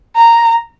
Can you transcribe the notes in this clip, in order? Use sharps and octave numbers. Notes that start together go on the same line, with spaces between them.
A#5